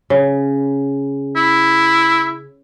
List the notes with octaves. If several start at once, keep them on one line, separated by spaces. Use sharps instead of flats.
C#3
E4